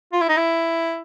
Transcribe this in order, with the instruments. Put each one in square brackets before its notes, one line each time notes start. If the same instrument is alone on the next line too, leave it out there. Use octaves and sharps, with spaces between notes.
[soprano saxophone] F4
E4
D#4
E4